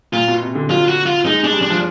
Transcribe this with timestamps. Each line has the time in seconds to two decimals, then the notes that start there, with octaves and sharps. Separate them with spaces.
0.13 A#2 F4
0.28 B2
0.42 C3
0.55 D3
0.70 F#3 F4
0.88 F#4
1.06 F4
1.26 G#3 D#4
1.43 G#3 D4
1.53 G3
1.62 D4
1.70 F3